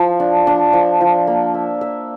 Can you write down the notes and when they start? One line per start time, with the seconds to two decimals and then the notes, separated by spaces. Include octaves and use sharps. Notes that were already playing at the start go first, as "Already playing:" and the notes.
Already playing: F3
0.20 D4
0.47 D4
0.73 F3
1.01 F3
1.27 A#3
1.54 E5
1.81 E5